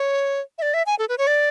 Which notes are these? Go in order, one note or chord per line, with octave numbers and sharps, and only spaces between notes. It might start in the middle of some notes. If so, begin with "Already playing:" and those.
Already playing: C#5
E5
D5
E5
G#5
A4
B4
C#5
D5